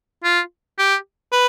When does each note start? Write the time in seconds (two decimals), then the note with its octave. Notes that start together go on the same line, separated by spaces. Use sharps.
0.24 F4
0.79 G4
1.32 B4